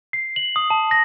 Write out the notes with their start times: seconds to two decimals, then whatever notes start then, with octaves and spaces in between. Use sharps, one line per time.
0.13 C7
0.36 F#7
0.56 D#6
0.70 A5
0.91 A#6